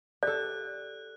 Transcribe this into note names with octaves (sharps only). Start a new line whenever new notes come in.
G4 A4 D5 F#6